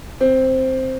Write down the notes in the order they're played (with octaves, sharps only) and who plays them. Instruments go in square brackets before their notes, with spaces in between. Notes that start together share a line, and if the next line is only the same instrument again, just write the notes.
[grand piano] C4